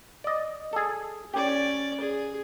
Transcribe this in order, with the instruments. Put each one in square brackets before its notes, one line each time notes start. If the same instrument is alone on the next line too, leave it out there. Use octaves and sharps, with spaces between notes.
[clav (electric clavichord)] D5 D#5
G#4 A4
[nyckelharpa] C#4 D5 [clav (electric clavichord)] G4
[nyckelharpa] G#4